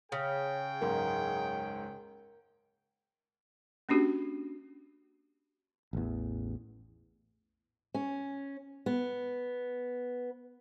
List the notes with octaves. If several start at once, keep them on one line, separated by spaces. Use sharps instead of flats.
C#3 G#4 C#5 G5
F#1 C#2 G#2 A#4
A#3 C#4 D4 F#4 G4
A1 E2
C#4
B3